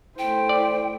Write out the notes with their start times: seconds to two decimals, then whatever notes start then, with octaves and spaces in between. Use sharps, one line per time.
0.19 A3 E4 C5 G5
0.49 D5